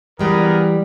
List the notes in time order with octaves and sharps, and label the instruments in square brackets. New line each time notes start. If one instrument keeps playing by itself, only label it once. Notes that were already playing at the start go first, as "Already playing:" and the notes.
[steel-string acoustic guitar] E3 G3 [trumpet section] B3 G#4 A#4